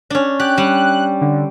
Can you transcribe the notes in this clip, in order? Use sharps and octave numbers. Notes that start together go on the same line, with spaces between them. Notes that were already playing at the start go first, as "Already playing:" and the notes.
C#4 D4
G4 F#6
G3
D3